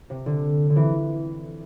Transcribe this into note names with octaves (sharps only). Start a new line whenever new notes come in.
C3
D3
D3
C3 E3